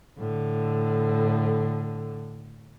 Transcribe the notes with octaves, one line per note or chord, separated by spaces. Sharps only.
A2 D3